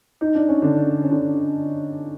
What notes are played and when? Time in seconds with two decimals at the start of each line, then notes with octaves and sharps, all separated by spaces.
0.21 D#4
0.35 D4
0.49 C#4
0.62 D3 D4
1.04 C#4
1.11 D3 D4